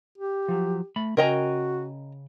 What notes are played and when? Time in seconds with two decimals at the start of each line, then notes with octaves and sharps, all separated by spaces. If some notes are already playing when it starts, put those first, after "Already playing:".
0.18 G4
0.48 F3 F#3
0.96 A3 B5
1.17 C#3 F#4 A#4 D#5 G5 G#5 A#5